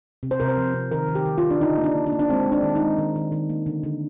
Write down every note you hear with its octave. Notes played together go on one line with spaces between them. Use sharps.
C3
C5
C3 A#4
C5
F3
C3
D#3 A#4
D#3
G4
D#3
F4
D#3
D4
D3 D#4
A#3
D4
A#3
D4
A#3
D4
G#3 C4
G#3
D4
D#3
D#4
G#3
D#3
D#3
D#3
A#3
D3
D3